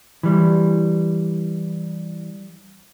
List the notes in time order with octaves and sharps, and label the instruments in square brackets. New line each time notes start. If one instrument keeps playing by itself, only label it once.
[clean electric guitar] E3 G3